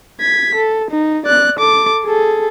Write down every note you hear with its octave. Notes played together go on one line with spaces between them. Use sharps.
G#6 B6
A4
D#4
D5 F#6
A4 D6
G#4 A4